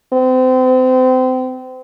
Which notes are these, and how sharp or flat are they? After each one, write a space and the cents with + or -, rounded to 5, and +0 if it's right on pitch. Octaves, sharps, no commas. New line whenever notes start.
C4 -30